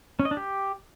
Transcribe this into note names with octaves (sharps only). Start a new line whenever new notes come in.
C#4
D#5
D4
G4